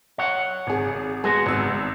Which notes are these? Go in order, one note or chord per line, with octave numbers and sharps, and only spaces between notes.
C#5 F#5
G#1 G#4
G#3 B3 F#4 G#4
G#1 E6